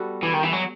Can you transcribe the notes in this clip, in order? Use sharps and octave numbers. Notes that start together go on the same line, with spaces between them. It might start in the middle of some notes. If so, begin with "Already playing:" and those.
Already playing: G3 B3 F#4 A4
E3
D#3
E3
F#3